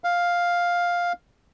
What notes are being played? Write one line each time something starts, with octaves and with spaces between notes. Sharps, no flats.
F5